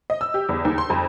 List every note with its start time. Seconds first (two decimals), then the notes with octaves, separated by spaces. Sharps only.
0.10 D#5
0.21 E6
0.34 G4
0.49 E2
0.65 D#2
0.78 C6
0.90 F2